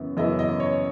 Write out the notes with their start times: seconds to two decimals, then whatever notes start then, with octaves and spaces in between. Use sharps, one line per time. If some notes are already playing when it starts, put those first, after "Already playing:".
Already playing: F#2 C#3 E3 B3
0.17 F#2 C#3 E3 B3 E4 D#5
0.39 D#5
0.60 C#5